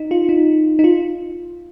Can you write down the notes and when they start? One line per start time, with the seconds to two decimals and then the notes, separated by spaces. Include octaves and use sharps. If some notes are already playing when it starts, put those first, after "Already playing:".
Already playing: D#4
0.11 F4
0.29 D#4
0.79 D#4
0.84 F4